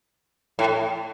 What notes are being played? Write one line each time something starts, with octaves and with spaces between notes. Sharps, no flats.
A2